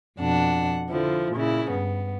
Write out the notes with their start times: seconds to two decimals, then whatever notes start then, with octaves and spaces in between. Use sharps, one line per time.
0.18 F2 B2 D4 F#5
0.90 D3 F3 E4
1.33 A#2 C#3 E4
1.70 G2 B3